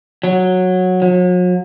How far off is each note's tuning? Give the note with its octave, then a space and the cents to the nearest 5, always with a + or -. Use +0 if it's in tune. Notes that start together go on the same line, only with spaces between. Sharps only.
F#3 -10
F#3 -40